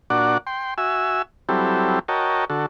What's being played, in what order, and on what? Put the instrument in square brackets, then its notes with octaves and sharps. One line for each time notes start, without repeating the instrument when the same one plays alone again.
[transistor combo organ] A#2 D4 F#4 D5 F#5
G5 C6
F#4 E5 G#5 E6
F#3 G3 C4 E4 G4 A4
F#4 A#4 C#5 D#5 G5 A5
D3 F#4 A4